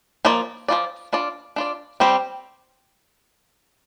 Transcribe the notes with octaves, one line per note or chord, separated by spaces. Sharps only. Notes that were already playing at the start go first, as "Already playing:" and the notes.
F3 A#3 F4 D5
F3 A#3 F4 D5
D4 F4 D5
D4 F4 D5
G3 C4 G4 C5